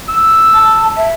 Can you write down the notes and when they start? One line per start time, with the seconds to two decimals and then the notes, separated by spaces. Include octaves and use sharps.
0.09 E6
0.54 A5
0.97 E5